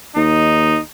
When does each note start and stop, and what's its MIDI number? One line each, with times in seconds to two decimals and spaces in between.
0.16 0.77 39
0.16 0.80 63